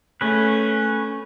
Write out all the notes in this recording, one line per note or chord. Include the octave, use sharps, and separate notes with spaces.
A3 C#4 B4